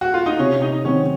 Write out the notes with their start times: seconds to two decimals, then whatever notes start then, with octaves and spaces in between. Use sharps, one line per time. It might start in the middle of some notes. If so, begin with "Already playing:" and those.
0.01 F#4
0.14 F4
0.26 D#4
0.39 C3 C#4
0.62 D#4
0.85 D#3 F#3 C4 C#4 F#4